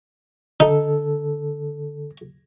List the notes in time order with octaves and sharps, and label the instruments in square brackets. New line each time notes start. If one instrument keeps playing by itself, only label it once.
[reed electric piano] D3 A4 [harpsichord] D#4